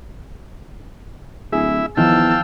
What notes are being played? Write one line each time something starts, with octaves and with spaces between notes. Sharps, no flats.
D1 E4 G#4 E5
E2 D#3 F3 D#4 F5 G5 A5 E6